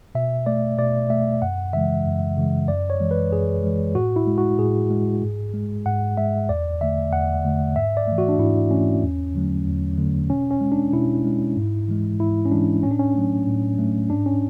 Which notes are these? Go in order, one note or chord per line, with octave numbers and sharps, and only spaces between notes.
B2 E5
A3 D5
B2 D5
A3 E5
F#2 F#5
C#3 E3 G#3 E5
F#2
C#3 E3 G#3
F#2 D5
C#5
E3 G#3
B4
F#2 G#4
E3 G#3
A2 F#4
E4
G#3
F#4
A2 G#4
G#3
G#2
G#3
G#2 F#5
G#3 E5
E2 D5
D3 A3 E5
E2 F#5
D3 A3
G#2 E5
D5
E3 A3
F#4
D4
G#2 E4
E3 A3 C#4
E2
D3 F#3 A3
E2
D3 F#3 A3
B2 C#4
C#4
G#3
D4
B2 E4
G#3
G#2
E3 G#3
G#2 E4
C#4
E3 G#3 D4
A2 C#4
D4
C#4
F#3 A3
A2
F#3 A3
G#2 D4
C#4